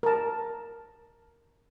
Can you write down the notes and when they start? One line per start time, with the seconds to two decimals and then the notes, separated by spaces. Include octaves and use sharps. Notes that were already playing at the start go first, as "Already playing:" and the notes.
0.03 A#4 A5